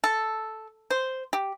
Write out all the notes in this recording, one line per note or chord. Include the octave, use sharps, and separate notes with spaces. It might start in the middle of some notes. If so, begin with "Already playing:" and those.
A4
C5
G4